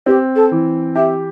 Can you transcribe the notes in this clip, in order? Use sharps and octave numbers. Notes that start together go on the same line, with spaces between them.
C4 G4
A4
E3
G4 E5